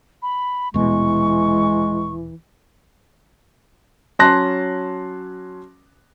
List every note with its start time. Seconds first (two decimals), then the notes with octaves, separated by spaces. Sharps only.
0.22 B5
0.74 D#1 B2 E3 G#3 C#6
4.19 F#3 C#4 A5 C6 F#6 A#6